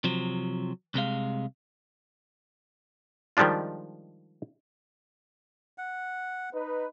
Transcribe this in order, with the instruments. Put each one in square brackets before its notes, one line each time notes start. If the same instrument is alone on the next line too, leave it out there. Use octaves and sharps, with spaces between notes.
[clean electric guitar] C3 F3 F#3
C2 C3 G#3 F5
[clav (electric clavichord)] D#3 F3 G3 G#3 D4 F4
[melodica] F#5
[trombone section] D#4 B4